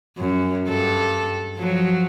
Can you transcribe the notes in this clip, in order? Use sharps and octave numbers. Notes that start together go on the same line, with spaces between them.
F#2
G2 A4
F3 F#3